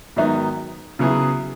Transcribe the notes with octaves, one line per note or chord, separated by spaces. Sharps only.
G#2 D#3 F#3 B3 D#4
C#3 F#3 B3 E4 G#4